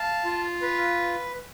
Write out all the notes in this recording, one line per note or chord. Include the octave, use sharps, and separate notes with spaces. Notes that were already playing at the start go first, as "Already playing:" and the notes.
Already playing: F5 A5
F4
B4